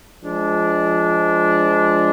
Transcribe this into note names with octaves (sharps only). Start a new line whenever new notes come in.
F3 G#3 D4